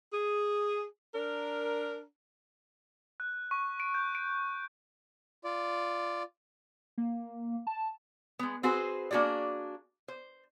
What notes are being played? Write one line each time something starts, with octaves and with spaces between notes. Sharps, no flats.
G#4
D4 A#4
F#6
C#6
D7
G6
D7
F4 D5
A#3
A5
G#3 B3
C4 F#4 G#4 B4 C5
A#3 D4 F#4 G#4 D5
C5